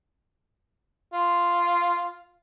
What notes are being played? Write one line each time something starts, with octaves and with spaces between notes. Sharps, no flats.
F4